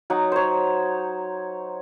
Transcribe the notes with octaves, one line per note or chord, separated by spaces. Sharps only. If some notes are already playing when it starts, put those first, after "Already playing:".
F#3 D#4 F#5
C5 C#5